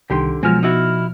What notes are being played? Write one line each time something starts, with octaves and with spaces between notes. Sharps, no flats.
C2 D3 D#3 G4 C6
B2 F3 F#3 G#3 F6
D#4 E4 F#4